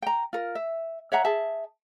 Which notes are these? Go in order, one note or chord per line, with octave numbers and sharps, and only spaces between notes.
G5 A#5
F4 A#4
E5
C#5 E5 F#5 A#5
G#4 E5 A5